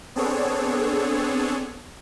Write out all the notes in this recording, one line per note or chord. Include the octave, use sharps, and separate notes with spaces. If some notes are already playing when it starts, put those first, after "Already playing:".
B3 C4 D4 G#4 A4 C#5